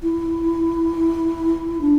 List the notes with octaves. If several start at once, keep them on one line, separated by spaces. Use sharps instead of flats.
E4
D4